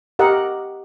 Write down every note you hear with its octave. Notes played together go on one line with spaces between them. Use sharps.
G4 A#4 D#5 F#5